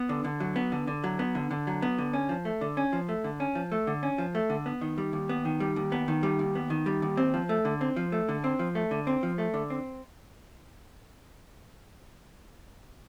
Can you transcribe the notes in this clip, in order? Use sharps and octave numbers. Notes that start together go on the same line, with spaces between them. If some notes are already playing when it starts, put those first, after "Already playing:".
Already playing: B3
D3
D3
F#3
B3
D3
D3
F#3
B3
D3
D3
F#3
B3
D3
C#4
F3
A3
D3
C#4
F3
A3
D3
C#4
F3
A3
D3
C#4
F3
A3
D3
B3
D#3
G3
D#2
B3
D#3
G3
D#2
B3
D#3
G3
D#2
B3
D#3
G3
D#2
C4
F3
A3
D3
C4
F3
A3
D3
C4
F3
A3
D3
C4
F3
A3
D3
C4